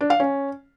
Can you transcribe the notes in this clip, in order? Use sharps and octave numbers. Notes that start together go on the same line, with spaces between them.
D4
F5
C#4